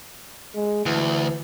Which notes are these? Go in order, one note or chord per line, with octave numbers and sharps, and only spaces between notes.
G#3
D2 E3